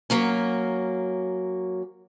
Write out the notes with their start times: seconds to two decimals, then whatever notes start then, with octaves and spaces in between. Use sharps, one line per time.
0.10 F#3 A#3 C#4